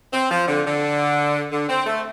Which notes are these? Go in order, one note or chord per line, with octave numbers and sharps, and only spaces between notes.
C4
F3
D3
D3
D3
C4
A3